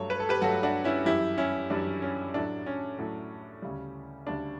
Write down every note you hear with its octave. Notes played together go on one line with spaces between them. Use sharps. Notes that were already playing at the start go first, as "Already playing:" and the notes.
Already playing: G2 F#3 A3 A4 C#5
B4
A4
G4 B4
G2 F#3 A3 F#4 A4
D4 F#4
C#4 E4
F#2 E3 G3 E4 G4
C#4 E4
F#2 E3 G3 D4
C#4
A2 F#3 A3 D4
C#4
A2 F#3 A3
D2 C#3 G3
D2 C#3 G3 D4